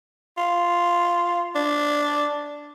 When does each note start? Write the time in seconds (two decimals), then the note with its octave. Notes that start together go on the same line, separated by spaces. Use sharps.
0.38 F4
1.55 D4